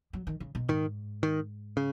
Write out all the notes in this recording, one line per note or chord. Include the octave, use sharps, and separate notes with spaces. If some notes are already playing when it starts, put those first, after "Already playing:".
F#3
D#3
C#3
B2
G#2 D#3
D#3
C#3